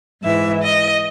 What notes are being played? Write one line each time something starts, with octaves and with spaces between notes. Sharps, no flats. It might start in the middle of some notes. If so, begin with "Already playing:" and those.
G#2 E3 E5
D#5